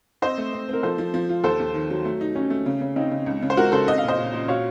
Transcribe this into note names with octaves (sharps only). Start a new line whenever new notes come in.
C4 C5 D#5
A3
C4
C4 A#4
F3 A4 C5
F3
F3
F4
D#2 A4 C5
D#2
D#3
F#3
A3
D#4
C#4 D#4
A3
C#3
C#3
C#3 C4 D#4
C#3
C#2
C#3
C5
C#2 F#4 A#4
C#3 A4 C5
C4 D#5
F5
A#2
C5 D#5
A#2
A#2
F#4 C#5 F5